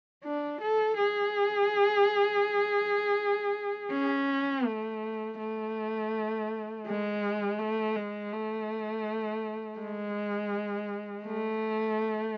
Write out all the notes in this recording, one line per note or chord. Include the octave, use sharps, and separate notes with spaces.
D4
A4
G#4
C#4
A3
A3
G#3
A3
G#3
A3
G#3
A3